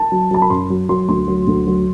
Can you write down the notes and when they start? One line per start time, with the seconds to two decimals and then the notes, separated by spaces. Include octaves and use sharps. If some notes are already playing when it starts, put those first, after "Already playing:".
Already playing: A5
0.12 F#3
0.31 F#3 A5
0.42 B5
0.50 F#2 C6
0.70 F#3
0.89 F#3 C6
1.08 D2 C6
1.28 F#3
1.47 D2
1.67 F#3